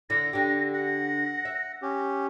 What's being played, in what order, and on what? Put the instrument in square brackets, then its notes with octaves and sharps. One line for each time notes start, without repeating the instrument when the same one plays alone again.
[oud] D3 E4 [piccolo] A#6
[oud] D3 G4
[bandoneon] F#5 [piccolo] A#6
[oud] E5
[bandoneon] C#4 G4